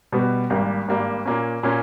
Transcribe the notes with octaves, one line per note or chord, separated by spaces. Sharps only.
B2 G3 B3
G#1 G2 G3 A#3
G#1 G2 G3 A#3
A#2 A#3 C#4
A#2 A#3 C#4